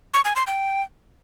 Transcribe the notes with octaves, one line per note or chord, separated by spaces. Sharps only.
C#6
G#5
C6
G5